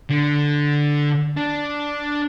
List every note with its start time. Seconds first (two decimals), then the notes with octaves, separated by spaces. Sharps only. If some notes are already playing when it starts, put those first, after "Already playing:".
0.10 D3
1.37 D4